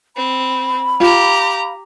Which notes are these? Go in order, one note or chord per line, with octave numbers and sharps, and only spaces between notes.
C4 B5
F4 G4 A#5